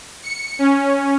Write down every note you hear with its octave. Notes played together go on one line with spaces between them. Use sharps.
C#7
C#4